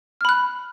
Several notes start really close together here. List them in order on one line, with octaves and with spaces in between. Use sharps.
F6 B5 F#6